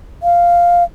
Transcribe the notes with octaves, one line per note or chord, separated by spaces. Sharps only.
F5